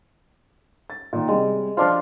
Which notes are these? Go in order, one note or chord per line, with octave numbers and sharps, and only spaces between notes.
A6
A#2 D#3
C3 G3 G#3
F3 D4 F4 C5 A5 F6